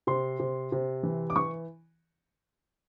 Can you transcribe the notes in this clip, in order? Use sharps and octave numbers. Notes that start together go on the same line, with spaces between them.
C3 C6
C3
C3
E3
D6
E3 C#6